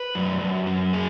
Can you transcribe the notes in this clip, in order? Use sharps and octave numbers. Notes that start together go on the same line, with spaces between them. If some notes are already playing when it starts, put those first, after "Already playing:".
Already playing: B4
F#2
F#2
F#3
G#4